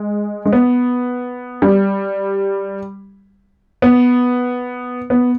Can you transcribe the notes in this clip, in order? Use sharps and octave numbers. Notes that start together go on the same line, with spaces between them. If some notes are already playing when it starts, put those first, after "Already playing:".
Already playing: G#3
G#3
B3
G3
B3
B3